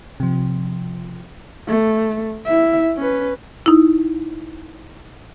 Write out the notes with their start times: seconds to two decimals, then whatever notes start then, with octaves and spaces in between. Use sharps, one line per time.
0.20 C3 F3
1.68 A3
2.46 E4 E5
2.97 C#4 B4
3.66 D#4 E4